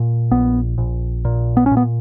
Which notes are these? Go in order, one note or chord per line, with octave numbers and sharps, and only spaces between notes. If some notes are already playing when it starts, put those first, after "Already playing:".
Already playing: A#2
A#1 B3
A#1
A#2
B3
C#4
A#2
B3